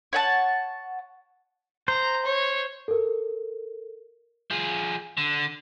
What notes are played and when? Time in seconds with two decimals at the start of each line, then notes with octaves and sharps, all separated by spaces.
0.13 C#5 F#5 A5
1.88 C5 A#5
2.26 C#5
2.88 A4 A#4
4.50 F3 G#4
5.17 D3